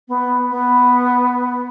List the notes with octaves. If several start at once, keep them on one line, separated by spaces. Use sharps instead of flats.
B3
B3